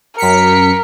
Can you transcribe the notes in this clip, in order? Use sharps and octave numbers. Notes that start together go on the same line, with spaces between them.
F#2 A#4 B6 C#7